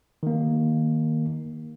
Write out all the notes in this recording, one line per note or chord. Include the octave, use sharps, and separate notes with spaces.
D#3 A#3